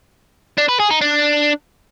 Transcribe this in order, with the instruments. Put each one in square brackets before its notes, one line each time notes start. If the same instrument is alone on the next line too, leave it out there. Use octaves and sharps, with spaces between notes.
[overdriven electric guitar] D4
B4
G#4
D#4
D4